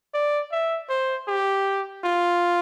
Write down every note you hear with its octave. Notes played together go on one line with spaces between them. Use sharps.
D5
E5
C5
G4
F4